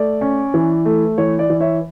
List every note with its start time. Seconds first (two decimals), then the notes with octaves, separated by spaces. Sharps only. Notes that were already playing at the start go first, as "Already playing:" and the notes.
Already playing: A3 D5
0.21 C#4
0.54 E3
0.85 A3
1.18 E3 C#5
1.39 D5
1.50 E3
1.60 C#5 E5